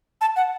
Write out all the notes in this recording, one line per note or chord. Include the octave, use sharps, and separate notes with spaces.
A5
F#5